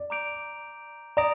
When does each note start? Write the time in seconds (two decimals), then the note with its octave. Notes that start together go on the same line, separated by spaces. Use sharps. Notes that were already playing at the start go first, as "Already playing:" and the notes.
Already playing: D5
0.10 A#5 D6 G6 D7 F7
1.17 D5 A#5 D#6 A#6 D7 F7